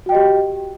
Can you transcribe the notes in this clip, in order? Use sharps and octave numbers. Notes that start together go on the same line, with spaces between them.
F#4 G4 D#5 G5